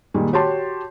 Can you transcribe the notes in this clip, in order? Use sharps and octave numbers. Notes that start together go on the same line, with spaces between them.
A#2 D#3 G3 G#3
F#4 G4 C#5 A5 C6